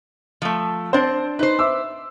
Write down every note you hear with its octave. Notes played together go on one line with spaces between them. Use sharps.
F3 A3
C4 D4 C5
D#4 B4 C5
E5 D6 E6